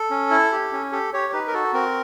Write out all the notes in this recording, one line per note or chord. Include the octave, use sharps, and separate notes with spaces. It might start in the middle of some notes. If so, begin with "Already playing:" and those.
Already playing: A4
C#4
E4
G4
C#4
G4 A4
G4 C#5
D#4 B4
A#4
F#4 A4
C4 A#4